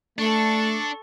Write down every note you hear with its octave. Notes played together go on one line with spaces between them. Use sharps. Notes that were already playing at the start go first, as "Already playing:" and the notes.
A3 D4 A4 C#6